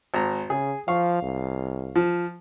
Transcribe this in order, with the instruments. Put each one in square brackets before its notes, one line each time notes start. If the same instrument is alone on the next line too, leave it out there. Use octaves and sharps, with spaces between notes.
[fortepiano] G#1 A#5
[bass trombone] C#3 [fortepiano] G#4
[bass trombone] F3 [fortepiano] F5 C#6
[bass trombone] C2
[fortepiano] F3